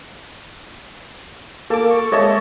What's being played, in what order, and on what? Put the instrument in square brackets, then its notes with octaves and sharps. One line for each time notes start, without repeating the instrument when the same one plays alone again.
[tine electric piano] A#3 D6 [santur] A4
[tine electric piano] C#6
[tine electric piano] G#3 D#5 [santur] C#5 E5 A5